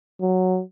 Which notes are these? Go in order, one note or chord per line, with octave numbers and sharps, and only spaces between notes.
F#3